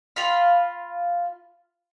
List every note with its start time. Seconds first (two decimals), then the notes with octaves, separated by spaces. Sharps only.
0.16 F4 F5 B5